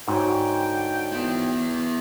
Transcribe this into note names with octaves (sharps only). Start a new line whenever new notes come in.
G#2 D3 D#4 F#4 C#5 G5
B3 E4